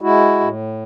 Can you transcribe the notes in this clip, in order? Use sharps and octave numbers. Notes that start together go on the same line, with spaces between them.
G#3 E4 F#4
A2